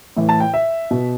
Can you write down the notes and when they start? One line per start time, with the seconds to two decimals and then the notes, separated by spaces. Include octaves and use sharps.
0.17 A2 E3
0.29 A5
0.40 G5
0.54 E5
0.91 B2